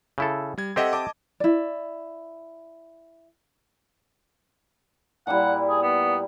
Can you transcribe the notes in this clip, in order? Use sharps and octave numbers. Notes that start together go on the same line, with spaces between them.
C#3 E4 A4
G3 G#6
C4 G4 A4 D#5 E5 F#5
D#5 A5 D6
E4 D5
A#2 G3 E4 F#5
G#4
B3